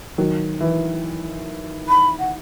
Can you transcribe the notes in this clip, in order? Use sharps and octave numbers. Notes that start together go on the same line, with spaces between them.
D#3 F#3
E3
B5
F#5